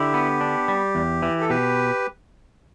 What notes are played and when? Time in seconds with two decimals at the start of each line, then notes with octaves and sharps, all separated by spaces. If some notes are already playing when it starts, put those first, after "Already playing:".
Already playing: D3 E4 G4
0.14 B3
0.41 D4
0.68 G3
0.95 E2
1.23 E3
1.41 A4
1.49 B2 G4 B4